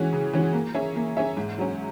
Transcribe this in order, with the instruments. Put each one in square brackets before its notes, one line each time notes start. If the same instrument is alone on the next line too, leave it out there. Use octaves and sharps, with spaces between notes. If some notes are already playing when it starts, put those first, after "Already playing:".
Already playing: [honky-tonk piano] E3 G#3 C#4 F#4
C#3
E3 G#3 C#4 F#4
A#3
C#4 G#4 C#5 E5
A#3
C#4 G#4 C#5 E5
G#2
F#3 C#4